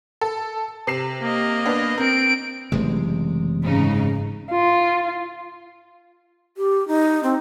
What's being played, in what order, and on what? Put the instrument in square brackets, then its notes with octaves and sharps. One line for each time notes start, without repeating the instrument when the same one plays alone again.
[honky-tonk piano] A4
C3 C7 E7
[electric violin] A#3 D#5
[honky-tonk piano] B3 D4
[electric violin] C4 D7 [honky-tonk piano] A#4
[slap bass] F#1 C3 G#3 [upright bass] E3 A3
[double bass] G#2 [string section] C#3 D#4
[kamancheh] F4
[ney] G4
D#4
C4